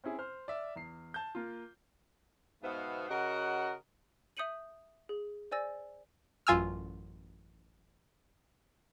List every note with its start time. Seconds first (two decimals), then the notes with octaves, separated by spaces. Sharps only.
0.04 C4 C#4 E4 G#4
0.19 C5 F6
0.48 D5 E5
0.76 E2 C7
1.14 A5 G6
1.35 A#3 F4
2.63 G#2 B2 B3 C5 E5 F5
3.09 C#3 F#4 A#4 D#5 F#5
4.37 E5 D#6 G6 C#7 D#7 F#7
5.09 G#4
5.51 C5 D5 G#5 E6 A6 A#6
6.47 A1 F#2 F4 G#5 E6 F6